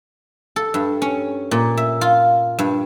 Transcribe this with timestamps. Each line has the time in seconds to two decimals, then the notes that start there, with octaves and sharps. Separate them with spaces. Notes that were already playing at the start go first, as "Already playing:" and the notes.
0.56 A4
0.74 G2
1.02 C#4
1.51 A#2
1.77 E5
2.01 F4
2.59 G2